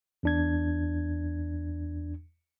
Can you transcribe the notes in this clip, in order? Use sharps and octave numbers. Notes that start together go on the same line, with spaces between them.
E2 D4 G#6